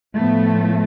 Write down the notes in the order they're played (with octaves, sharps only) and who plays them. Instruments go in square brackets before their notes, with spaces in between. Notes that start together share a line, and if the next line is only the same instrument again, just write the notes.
[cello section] A2 F3 A3 B3